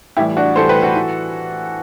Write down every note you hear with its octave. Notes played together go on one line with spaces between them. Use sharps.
A2 E3 G3 E4 G4
D4 F#4
A2 E3 G3 A4 C5
G4 B4
F#4 A4
E3